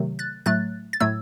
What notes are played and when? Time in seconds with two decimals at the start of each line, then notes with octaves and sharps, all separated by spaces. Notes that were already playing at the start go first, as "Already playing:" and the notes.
Already playing: C3 D#3 F#3 A3
0.19 F#6 A6
0.46 A2 F#3 A3 F#6 A6
0.93 A6
1.00 A2 F#3 A3 E6 G#6